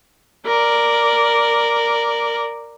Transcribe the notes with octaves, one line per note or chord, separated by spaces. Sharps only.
A#4 D5